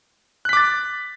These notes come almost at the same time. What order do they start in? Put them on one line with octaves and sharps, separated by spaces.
F#6 B6 D6 A6